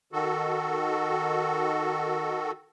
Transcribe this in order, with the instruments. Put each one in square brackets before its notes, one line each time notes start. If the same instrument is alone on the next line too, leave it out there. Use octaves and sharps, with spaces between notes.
[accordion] D#3 F#4 A4